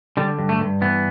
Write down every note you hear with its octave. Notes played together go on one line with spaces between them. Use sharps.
D3 G3
G2
A3
G2
E3 B3